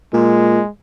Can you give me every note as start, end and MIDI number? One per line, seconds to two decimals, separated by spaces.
0.14 0.60 46
0.14 0.69 56